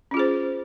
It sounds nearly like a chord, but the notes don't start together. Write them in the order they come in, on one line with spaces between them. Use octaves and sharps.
C#4 F4 G#4 C5